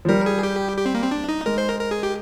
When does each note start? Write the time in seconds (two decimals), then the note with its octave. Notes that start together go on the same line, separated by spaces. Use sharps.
0.05 F3
0.08 G3 A#4
0.26 G#4
0.43 G4
0.77 G4
0.86 C4
0.95 A#3
1.03 C4
1.11 D4
1.29 D#4
1.46 G#3 A#4
1.58 C5
1.69 A#4
1.80 A#4
1.91 G#4
2.03 G4